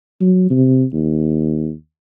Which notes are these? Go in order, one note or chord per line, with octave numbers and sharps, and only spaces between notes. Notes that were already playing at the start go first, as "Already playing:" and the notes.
F#3
C3
D#2